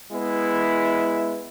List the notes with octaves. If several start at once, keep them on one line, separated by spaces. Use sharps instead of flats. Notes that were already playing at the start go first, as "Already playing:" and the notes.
G#3 B3 E4